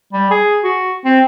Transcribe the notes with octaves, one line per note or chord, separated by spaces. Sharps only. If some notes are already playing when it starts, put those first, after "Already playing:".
G3
G#4
F#4
C4